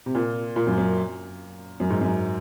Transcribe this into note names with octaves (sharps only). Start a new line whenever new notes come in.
C3
A#2
A#2
F#2
F#2
F#2
G#2
F#2